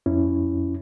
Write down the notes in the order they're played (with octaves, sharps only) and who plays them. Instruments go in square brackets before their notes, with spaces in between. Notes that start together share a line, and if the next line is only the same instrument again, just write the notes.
[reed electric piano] F2 C#4 E4